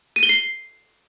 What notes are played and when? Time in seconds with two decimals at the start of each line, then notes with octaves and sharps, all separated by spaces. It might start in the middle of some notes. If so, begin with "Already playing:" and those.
0.16 D#7
0.23 G7
0.29 C7